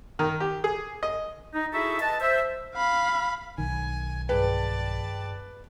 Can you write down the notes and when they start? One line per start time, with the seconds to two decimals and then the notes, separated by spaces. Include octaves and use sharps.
0.19 D#3
0.40 G4
0.64 G#4
1.03 D#5
1.54 D#4
1.73 D#4 E4 F#4 G#4 A4 E5
2.00 B4 D#5 A5
2.21 C5 E5
2.75 F5 B5
3.58 B1 D#3 G#5
4.29 G2 G#4 B4 D5 G5 A5